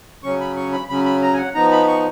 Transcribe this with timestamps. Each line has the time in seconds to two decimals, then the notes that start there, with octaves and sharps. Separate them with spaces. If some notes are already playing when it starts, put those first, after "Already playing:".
0.23 C#3 F#3 C#4 C#6
0.40 B5
0.56 C#6
0.73 B5
0.89 C#3 F#3 C#4 B5
1.05 B5
1.22 A#5
1.33 G#5
1.38 F#5
1.55 F3 B3 D#4 A#5
1.71 B5
1.88 C#6